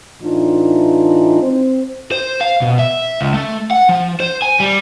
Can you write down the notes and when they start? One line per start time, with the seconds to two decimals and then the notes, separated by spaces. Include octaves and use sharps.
0.22 A2 E3 D4 D#4 F4
1.41 C4 C5
2.12 C5
2.41 F5
2.62 B2
2.79 E5
3.21 C#2
3.34 A3
3.71 F#5
3.89 F3
4.20 C5
4.42 G#5
4.60 G3